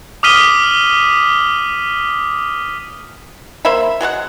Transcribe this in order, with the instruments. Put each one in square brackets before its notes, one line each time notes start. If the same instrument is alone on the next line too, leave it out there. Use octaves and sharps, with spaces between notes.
[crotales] D6 D#6 F6 B6 D#7 G7
[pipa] A#3 C5 E5 B5
F#3 G#3 F4 F#5